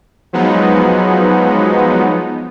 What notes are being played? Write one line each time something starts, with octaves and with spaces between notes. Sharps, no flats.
F3 F#3 G#3 B3 D#4